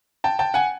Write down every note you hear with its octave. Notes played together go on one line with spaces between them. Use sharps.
G5 A5
G5 A5
F#5 G#5